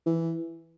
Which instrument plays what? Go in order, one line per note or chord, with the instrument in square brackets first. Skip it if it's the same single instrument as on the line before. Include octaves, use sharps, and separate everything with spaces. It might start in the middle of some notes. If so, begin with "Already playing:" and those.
[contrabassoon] E3